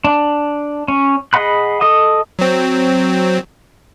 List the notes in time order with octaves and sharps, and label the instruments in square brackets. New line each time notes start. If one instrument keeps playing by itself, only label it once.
[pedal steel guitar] D4
C#4
G#4 D#5 F#5 B5 F#6
A4 D#5 D#6
[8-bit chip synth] F#3 C4